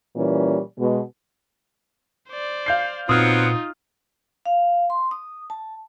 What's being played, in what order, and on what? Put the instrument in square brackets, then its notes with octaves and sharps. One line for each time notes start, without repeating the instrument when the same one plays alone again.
[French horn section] A#2 E3 G3 C#4
B2 G#3
[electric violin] C5 D5
[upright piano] F5 G6 C7
[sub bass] A#2 [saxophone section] F#3 B3 C4 [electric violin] D#4 F4 [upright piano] D#6 F6
[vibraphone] F5
C6
D#6
A5